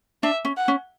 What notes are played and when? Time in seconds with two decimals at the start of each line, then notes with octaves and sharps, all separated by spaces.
0.23 D4 E5
0.45 C#4
0.57 F#5
0.68 C#4